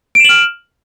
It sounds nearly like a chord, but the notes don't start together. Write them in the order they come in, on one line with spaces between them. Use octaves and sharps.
D7 E7 F#7 F6